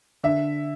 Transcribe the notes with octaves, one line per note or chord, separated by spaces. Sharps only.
D3 E5